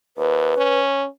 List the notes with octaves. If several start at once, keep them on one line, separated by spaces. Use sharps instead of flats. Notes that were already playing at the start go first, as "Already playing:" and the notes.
D#2 B4
C#4